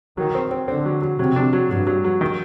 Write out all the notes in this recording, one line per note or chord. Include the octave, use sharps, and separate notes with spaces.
D#3 F#3
C4
C4
D3 C4
F#3
F#3
C3 F#3
D4
F#3
G2 F#3
F#3
F#3
D#3